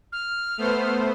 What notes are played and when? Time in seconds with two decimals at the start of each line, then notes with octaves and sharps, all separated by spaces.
0.12 F6
0.58 A3 B3 C5